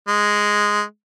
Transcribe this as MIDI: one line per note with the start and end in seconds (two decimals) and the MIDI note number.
0.08 0.82 56